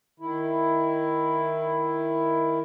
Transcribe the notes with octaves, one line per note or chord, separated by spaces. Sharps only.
D#3 E4